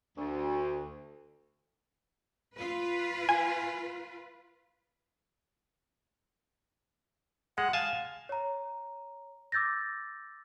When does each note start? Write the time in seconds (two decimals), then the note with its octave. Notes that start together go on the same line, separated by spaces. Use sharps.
0.17 D2
2.56 F4 B4
3.29 G#5
7.58 G#3 F#5
7.73 F5 G#5 A5
8.29 C#5 A#5
9.52 D6 E6 G6 A6 A#6